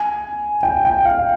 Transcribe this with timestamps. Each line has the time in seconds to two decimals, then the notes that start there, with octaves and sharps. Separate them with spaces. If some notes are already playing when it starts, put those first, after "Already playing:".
Already playing: G#5
0.63 G5
0.85 G5
1.05 F5